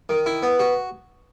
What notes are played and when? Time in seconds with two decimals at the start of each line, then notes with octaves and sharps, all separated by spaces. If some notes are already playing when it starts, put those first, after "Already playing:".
0.09 D#3
0.26 E4
0.43 B3
0.59 F#4